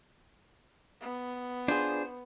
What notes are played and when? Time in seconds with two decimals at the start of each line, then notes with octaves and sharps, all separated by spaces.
1.01 B3
1.68 D4 F4 G#4 C5